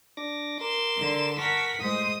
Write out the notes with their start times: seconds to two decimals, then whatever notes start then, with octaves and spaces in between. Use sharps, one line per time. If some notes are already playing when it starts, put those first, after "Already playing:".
0.17 D4 D6 A#6
0.61 A#4 C6 D6 E7
0.98 D3
1.38 A#4 F#5 A5 C#6 B6
1.81 A2 G#3 C5 D#6